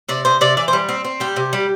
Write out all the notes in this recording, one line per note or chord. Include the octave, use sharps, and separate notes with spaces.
C3 D5
C3 C5
C3 D5
E3 D5
C5
G3
C4
C4
G3 G4
C3
G3